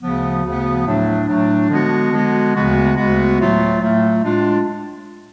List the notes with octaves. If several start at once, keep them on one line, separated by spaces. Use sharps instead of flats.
D2 C#3 F3 B3
D2 C#3 F3 B3
A2 F#3 A3 D4
A2 F#3 A3 D4
D3 F3 G#3 B3 F#4
D3 F3 G#3 B3 F#4
D2 C#3 G#3 B3 F#4
D2 C#3 G#3 B3 F#4
A2 F#3 A3 F4
A2 F#3 A3 F4
A2 G#3 D4 F4